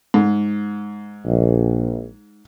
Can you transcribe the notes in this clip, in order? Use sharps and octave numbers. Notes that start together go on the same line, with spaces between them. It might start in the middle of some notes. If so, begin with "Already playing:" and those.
G#2
A#1